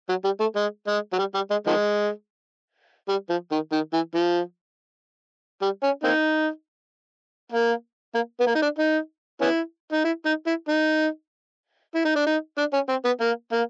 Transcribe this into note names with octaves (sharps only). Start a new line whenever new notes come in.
F#3
G3
A3
G#3
G#3
F#3
G3
G3
G#3
D#3 F3 G#3
G3
F3
D#3
D#3
E3
F3
G3
C#4
A#3 C4 D#4
A#3
A#3
B3
A#3
D#4
D4
D#4
B3 C#4 E4
D#4
E4
D#4
E4
D#4
E4
D#4
D4
D#4
D4
C#4
C4
B3
A#3
A#3